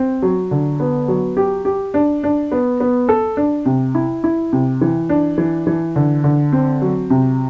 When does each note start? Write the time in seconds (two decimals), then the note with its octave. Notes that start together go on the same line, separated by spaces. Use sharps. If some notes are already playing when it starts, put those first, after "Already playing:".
Already playing: C4
0.22 F#3
0.51 D3
0.80 B3
1.08 F#3
1.37 G4
1.65 G4
1.94 D4
2.23 D4
2.52 B3
2.80 B3
3.09 A4
3.37 D4
3.66 C3
3.95 E4
4.24 E4
4.53 C3
4.81 E3
5.09 D4
5.38 E3
5.67 E3
5.96 D3
6.24 D3
6.52 C4
6.82 F#3
7.10 C3